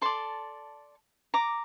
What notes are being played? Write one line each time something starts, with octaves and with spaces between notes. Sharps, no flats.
A4 D5 A5 C6
A#5 D6